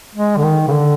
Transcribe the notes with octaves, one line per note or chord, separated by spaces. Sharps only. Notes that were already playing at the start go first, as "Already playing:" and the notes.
G#3
D3
D#3
C#3
D3